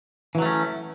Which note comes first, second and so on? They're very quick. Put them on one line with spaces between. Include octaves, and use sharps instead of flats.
E3 F#3 A3 C#4